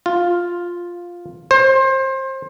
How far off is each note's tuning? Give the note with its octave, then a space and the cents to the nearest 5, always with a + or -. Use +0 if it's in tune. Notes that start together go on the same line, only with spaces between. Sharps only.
F4 +5
C5 +25